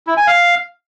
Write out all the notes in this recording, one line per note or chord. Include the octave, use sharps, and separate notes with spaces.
E4
G#5
F5